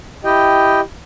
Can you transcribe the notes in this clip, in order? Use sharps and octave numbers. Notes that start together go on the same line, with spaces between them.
E4 G4 D#5 G5